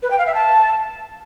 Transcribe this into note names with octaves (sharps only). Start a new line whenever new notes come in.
B4
G5
F5
E5
A5